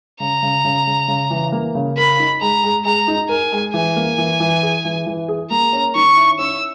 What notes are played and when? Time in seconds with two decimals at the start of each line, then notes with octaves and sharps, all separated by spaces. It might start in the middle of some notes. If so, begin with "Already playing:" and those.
0.20 C#3 A#5
0.43 C#3
0.65 C#3
0.87 C#3
1.08 C#3
1.30 E3
1.52 A#3
1.75 C#3
1.97 A#4 B5
2.19 D#4
2.41 G#3 A#5
2.63 G#3
2.85 G#3 A#5
3.08 D#4
3.29 A#4 G#5
3.52 G#3
3.74 E3 G#5
3.96 A#3
4.18 E3
4.40 E3
4.63 G#4
4.85 E3
5.06 E3
5.29 G#4
5.51 A#3 A#5
5.73 C#4
5.95 D#3 C#6
6.17 E4
6.38 C#4 E6